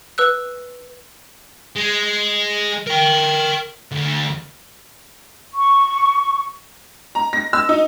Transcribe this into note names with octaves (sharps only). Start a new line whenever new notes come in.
B4 E6 F#6
G#3
A#4 G5
D2
C#6
A#5
A#6
E6
D#4